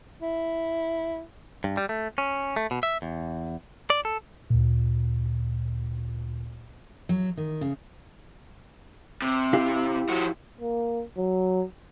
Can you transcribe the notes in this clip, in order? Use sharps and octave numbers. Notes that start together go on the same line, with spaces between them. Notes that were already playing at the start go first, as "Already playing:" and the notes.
E4
G2
G3
A3
C#4
A3
B2
E5
E2
D5
A4
D2 A#2
F#3
D#3
C#3
C3
E4 G4 F5
F3 F#4
A#3
F#3